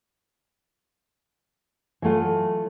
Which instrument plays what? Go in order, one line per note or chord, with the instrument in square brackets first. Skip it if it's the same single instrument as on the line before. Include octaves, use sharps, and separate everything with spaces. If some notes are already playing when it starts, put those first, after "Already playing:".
[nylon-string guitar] E3 F#3 A3 F4